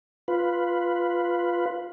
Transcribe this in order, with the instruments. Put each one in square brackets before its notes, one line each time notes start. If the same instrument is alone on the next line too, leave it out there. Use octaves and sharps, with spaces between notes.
[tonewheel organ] F4 B4